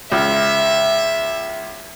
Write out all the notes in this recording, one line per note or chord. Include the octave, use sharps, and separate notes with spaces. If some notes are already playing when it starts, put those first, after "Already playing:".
C#2 E5